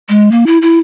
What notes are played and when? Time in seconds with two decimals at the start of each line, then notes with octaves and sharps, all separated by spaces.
0.09 G#3
0.32 A#3
0.47 E4
0.62 E4